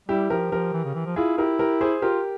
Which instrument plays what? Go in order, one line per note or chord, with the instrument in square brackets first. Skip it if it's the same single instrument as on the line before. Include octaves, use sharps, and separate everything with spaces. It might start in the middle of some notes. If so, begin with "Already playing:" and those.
[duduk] G3 [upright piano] E4 G4
[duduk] F3 [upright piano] G4 A#4
[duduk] F3 [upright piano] G4 A#4
[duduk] E3
C#3
E3
F3
[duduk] E4 [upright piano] F4 G#4
[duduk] E4 [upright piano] G4 A#4
[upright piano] G4 A#4
G#4 C5
[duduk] F4 [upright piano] G4 A#4